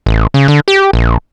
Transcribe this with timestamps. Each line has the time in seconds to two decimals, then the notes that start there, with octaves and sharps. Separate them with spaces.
0.06 A1
0.34 C#3
0.48 D3
0.68 G4
0.93 A#1